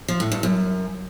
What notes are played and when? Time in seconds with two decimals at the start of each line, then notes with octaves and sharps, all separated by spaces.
0.08 F3
0.20 A2
0.32 G2
0.43 F#2